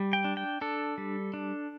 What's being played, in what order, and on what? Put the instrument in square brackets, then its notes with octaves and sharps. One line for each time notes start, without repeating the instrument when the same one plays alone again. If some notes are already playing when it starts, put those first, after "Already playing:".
Already playing: [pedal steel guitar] G3
G5
D4
G5
D4 A4
G3
D4